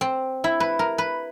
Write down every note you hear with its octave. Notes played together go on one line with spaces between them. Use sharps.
C4
E4
B4
A#4
B4